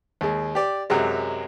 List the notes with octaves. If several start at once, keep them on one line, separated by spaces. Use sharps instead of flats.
D#2 G#3
G4 D5
F#2 C3 F#3 G#3